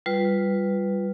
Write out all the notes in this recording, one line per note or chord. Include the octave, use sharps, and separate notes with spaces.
G3 F4 B4